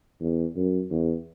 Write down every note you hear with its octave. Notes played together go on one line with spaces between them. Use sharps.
E2
F#2
E2